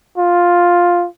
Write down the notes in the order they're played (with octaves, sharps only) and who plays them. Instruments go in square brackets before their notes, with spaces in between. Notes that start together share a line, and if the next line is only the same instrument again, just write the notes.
[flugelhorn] F4